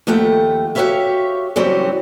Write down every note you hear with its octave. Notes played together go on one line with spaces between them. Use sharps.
D#2 F3 A3 F#5 G5
F#4 G4 C5 C#5 E5 F5
C#3 E3 F#3 G3 B3 C4